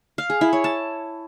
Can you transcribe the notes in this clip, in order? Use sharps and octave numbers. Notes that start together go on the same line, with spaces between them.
F5
G#4
E4
C#5
A5